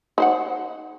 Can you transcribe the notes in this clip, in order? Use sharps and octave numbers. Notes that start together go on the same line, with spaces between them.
D#4 C5 F#5